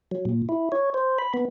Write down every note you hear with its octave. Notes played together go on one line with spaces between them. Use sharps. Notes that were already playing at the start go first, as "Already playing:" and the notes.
F#3
A#2
E4
C#5
C5
B5
B3